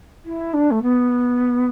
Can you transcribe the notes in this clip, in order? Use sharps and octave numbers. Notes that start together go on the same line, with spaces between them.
E4
D4
A3
B3